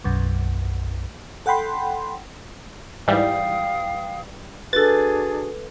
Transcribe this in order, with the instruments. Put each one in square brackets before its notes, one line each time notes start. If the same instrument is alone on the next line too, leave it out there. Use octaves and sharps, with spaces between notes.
[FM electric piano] B1 F#2
A4 F#5 G5 B5 C6
[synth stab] G#2 E3 G3 [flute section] F5 G5 D#6
[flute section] D4 F#4 G#4 [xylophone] A4 B4 [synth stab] A6